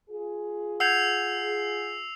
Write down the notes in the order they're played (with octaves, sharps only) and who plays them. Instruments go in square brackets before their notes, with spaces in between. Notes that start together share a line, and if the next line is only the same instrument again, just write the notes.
[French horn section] F4 G#4
[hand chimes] F#5 G6 G#6 [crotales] E6 C7 F7